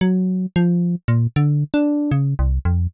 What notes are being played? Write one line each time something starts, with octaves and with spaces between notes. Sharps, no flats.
F#3
F3
A#2
D3
D4
C#3
C2
F2